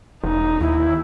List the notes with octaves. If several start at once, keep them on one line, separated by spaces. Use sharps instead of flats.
E1 D#4
D#2 E4